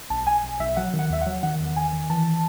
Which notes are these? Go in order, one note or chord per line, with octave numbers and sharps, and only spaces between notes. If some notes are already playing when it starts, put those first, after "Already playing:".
B1 A5
B1 G#5
B1
B1 E5
F#3 F#5
D#3
F#5
D#2 E5
F#3 F#5
D#3 F#5
E2
D#3 G#5
D#3
E3 A5